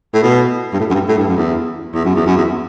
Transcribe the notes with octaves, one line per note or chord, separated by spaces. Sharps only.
A2
B2
G2
A2
F#2
G2
A2
G2
F#2
E2
E2
F#2
E2
F#2
E2